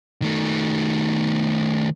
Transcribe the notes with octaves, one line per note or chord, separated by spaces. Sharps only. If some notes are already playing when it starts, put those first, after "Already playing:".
D#3 A3